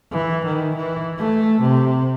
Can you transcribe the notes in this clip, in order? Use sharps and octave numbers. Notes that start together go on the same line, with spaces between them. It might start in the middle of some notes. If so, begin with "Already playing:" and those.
E3
D#3
E3
A3
C3